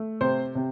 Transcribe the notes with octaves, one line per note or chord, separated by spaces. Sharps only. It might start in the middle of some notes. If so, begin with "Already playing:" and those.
Already playing: A3
C3 C5
C3